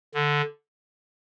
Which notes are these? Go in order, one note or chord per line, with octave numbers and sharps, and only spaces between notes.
D3